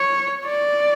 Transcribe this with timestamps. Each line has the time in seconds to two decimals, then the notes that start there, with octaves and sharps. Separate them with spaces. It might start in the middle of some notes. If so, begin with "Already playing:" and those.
Already playing: C#5
0.45 D5